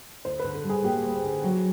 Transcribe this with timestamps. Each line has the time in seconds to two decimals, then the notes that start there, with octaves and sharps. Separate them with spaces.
0.25 D2 C5
0.39 D3 B4
0.55 A4
0.64 G3
0.70 G#4
0.84 A#3 G4
1.05 D2
1.24 D3
1.43 F#3 F#4